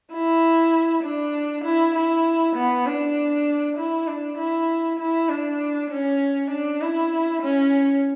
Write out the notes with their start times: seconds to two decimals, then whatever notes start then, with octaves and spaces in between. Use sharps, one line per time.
0.13 E4
1.03 D4
1.65 E4
1.95 E4
2.56 B3
2.86 D4
3.77 E4
4.08 D4
4.38 E4
4.99 E4
5.29 D4
5.91 C#4
6.51 D4
6.82 E4
7.42 C#4